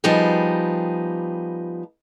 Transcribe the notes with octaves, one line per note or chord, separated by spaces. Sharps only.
F3 G3 B3 D#4 G4 G#4